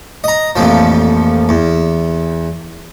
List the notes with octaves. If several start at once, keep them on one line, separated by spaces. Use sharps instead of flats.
D#5 A#5
A1 F2 A#2 F3
E2